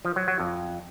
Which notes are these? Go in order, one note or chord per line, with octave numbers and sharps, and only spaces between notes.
F3
F#3
F#3
F2